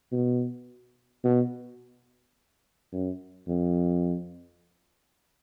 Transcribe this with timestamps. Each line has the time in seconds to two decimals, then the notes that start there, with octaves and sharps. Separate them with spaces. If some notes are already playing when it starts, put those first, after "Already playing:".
0.12 B2
1.24 B2
2.93 F#2
3.48 F2